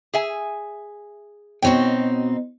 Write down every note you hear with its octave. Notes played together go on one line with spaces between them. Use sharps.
G#4 E5 G#5
B2 C4 D#4 F#4 C#5 G5